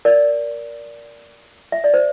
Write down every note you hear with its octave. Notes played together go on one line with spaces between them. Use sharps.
A#4 D5
E5
D5
C5